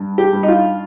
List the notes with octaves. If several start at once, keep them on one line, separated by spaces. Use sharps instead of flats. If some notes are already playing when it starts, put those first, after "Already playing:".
Already playing: G2
G4
G2
D#4
F4